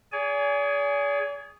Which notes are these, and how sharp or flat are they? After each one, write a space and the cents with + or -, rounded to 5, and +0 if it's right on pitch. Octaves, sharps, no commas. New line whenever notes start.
G#4 -5 D5 -45 G#5 +0